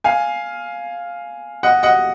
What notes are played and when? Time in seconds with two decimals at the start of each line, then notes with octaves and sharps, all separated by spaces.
0.04 F5 G#5
1.63 D#5 F#5
1.83 D#5 F#5